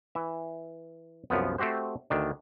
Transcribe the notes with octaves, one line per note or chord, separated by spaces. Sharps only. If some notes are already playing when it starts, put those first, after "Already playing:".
E3 E5
C2 F#2 F3 B3
A3 C4 F#4 G4 C5
D2 D#3 D4